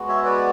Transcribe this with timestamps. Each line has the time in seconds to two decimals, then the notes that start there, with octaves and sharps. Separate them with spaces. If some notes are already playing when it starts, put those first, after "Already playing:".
Already playing: G#3 B3 F#4
0.08 C#5 E5
0.25 B4 D5